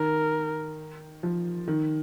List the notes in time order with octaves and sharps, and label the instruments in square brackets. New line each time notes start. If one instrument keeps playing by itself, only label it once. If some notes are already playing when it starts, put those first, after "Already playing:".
Already playing: [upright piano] D#3 [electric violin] A#4
[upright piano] F3
D#3